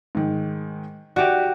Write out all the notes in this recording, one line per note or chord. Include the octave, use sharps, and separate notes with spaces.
G#2 D#3
F#4 G4 D5 E5